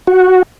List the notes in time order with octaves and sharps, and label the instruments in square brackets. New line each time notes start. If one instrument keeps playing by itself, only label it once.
[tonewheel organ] F#4